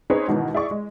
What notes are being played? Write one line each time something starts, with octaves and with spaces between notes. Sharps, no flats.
C4 C#4 D#4 G#4 B4 C#5
G#2 B2 D#3 E3
E4 G#4 D5 C#6
G#3